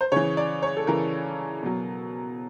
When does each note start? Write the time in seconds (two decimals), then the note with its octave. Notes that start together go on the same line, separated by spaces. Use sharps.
0.01 C5
0.12 C#3 E3 C#5
0.37 D5
0.62 C#5
0.77 A4
0.87 C#3 E3 A#4
1.63 B2 F#3